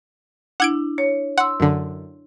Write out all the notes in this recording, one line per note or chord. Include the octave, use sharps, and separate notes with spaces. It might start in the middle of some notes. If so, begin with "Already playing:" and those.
D4 E4 F#5 G#6 D7
C#5
F#5 C6 E6
F#2 D3